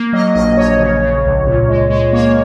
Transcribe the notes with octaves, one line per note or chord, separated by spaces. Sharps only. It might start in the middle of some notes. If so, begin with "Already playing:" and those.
Already playing: A#3
F#3 D#5
A#1 D#5
A#1 C#5
C#3
C#3
C#2
A#2
G#3
G#3
A#3 C#5